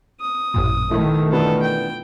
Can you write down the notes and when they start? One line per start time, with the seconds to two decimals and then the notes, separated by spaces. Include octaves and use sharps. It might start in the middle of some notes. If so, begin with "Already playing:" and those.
0.21 D#6
0.54 A1 F#2 A#2
0.91 B2 D#3 A3 E4
1.32 E3 B3 D4 F4 A4
1.62 G5